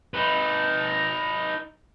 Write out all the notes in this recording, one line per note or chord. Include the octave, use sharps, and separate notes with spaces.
D#4 B4